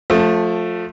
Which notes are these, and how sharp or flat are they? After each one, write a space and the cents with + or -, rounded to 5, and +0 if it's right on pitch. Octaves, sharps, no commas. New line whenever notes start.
F3 +25 A3 +0